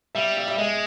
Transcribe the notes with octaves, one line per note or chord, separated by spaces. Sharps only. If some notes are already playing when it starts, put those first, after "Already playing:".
G3 E5
E5
E5
G#3 D#5